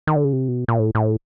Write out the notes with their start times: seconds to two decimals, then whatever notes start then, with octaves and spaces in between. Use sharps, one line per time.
0.07 D#3
0.16 D3
0.24 C#3
0.33 C3
0.48 B2
0.68 A#2
0.79 A2
0.95 A2